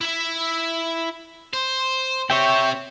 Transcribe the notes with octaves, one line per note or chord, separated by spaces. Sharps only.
E4 E5
C5
C4 G4 C#5 E5 G5